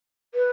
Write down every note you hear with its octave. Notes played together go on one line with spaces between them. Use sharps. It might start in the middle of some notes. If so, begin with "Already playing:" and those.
B4